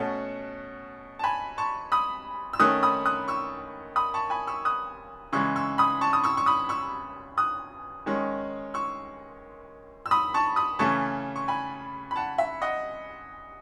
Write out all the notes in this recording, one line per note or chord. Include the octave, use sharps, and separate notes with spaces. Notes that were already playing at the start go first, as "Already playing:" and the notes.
Already playing: B2 A3 C#4 F#5 A5
A5
G#5 B5
A5 C#6
B5 D#6
E6
D#3 A3 C#4 D#6 F#6
B5 D#6
D#6 F#6
C#6 E6
B5 D#6
A5 C#6
G#5 B5
C#6 E6
D#6 F#6
C#3 E3 G#3 C#6 E6
C#6 E6
B5 D#6
A5 C#6
D#6
C#6 E6
C#6
B5 D#6
C#6 E6
D#6 F#6
D#3 G#3 C#4
C#6 E6
E6
B5 D#6
A5 C#6
B5 D#6
C#3 E3 A3 C#4 A5 C#6
C#6
G#5 B5
B5
F#5 A5
E5
D#5 F#5